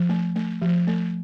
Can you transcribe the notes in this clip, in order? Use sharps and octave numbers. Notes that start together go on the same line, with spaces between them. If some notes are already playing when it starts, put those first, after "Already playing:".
Already playing: F3
A3
A3
F3
A3